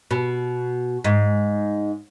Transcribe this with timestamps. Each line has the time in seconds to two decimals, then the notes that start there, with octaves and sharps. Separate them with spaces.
0.11 B2
1.05 G#2